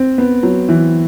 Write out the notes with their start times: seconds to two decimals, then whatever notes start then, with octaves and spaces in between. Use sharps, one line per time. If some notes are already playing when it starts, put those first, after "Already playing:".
Already playing: C4
0.18 B3
0.43 F#3
0.69 E3